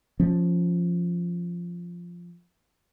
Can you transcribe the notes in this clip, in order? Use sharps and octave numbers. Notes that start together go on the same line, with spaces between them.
F3 C#4